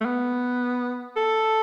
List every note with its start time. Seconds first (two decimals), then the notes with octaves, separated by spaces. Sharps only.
0.01 A3
0.05 B3
1.16 A4